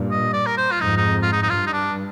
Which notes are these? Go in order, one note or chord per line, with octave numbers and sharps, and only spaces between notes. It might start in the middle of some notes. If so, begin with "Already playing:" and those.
Already playing: G2 A#2
D#5
D5
A#4
C5
F4
F2 G#2 D#4
D#4
F4
D#4
D#4
G2 F4
D#4
D4